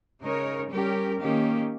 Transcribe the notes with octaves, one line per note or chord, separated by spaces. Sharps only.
C#3 G#3 D#4 A#4 C#5
G3 C#4 G4 A#4
D#3 A#3 C#4 G4